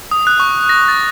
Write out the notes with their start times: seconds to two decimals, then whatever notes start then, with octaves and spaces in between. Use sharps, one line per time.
0.11 D#6
0.27 F#6
0.40 C#6
0.69 A#6
0.88 A6